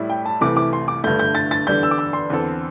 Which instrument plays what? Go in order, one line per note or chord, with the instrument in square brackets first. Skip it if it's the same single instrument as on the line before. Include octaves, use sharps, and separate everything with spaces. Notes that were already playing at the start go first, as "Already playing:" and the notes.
Already playing: [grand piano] A2 G3 E4
[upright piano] G5
A5
[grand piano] C2 C3 E3 A3 [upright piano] D6
[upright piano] D6
C6
D6
[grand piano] G1 G2 D3 A3 [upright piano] G6
[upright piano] G6
A6
A6
[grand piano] E2 D3 G3 D4 A4 [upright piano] G6
[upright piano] E6
D6
E6
C6
[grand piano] E2 D3 C4 A4